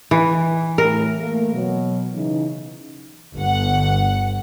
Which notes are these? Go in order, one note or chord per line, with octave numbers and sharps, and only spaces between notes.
E3
A2 A#4
A3 A#3
B2 F#3
C#3 E3 D#4
G1 F#5